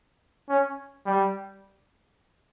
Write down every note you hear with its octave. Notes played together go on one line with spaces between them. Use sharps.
C#4
G3